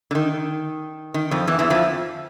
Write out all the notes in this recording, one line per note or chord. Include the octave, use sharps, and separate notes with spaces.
D3
D#3
D#3
F2 F3
E2 E3
E2 E3
F2 F3